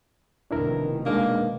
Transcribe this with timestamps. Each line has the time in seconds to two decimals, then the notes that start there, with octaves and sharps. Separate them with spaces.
0.51 F1 B2 D#3 D4 E4 A#4
1.06 G#3 A#3 D4 D#4